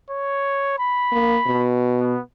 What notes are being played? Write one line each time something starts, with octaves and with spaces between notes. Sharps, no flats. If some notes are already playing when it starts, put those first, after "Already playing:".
C#5
B5
A#3
B2
B3